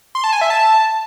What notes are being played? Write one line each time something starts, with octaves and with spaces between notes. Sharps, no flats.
C6
A5
G#5
E5
A5